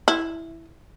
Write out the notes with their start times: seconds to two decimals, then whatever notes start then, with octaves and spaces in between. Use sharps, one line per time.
0.08 E4